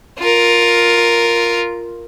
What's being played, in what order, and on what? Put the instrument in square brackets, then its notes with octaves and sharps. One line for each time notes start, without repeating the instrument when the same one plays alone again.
[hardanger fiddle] F4 A#4